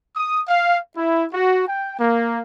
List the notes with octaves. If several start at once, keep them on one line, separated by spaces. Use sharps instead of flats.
D#6
F5
E4
F#4
G5
A#3